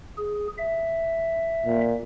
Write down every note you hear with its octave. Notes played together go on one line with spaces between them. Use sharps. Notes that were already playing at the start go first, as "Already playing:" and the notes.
G#4
E5
A#2